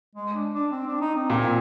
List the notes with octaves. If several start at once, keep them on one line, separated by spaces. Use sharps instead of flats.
G#3
D4
D4
C4
D4
D#4
C4
A#2